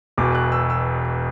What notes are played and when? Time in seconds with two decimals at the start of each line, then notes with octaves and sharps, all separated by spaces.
0.18 E1 E2 B2 D6
0.35 F#6
0.52 E6
0.70 E6